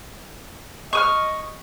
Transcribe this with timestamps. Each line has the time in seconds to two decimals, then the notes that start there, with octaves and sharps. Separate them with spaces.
0.93 D#5 C#6 D#6 F6